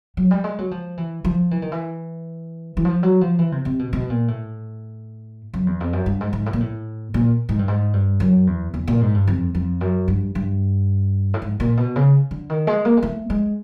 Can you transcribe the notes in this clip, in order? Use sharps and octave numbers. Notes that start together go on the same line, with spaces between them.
F#3
G3
G#3
F#3
F3
E3
F3
E3
D#3
E3
E3
F3
F#3
F3
E3
C3
C3
B2
B2
A#2
A2
F#2
E2
F2
F#2
G2
G#2
G#2
A2
A#2
A2
A#2
G#2
G2
G#2
G2
F#2
E2
E2
A#2
G#2
G2
F2
F2
F#2
G2
G2
A2
G#2
A#2
B2
C#3
D3
D#3
G#3
A#3
G#3
A3
G#3